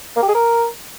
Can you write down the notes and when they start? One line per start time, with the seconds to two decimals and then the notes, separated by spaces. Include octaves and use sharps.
0.17 A#3
0.23 G4
0.29 G#4
0.35 A#4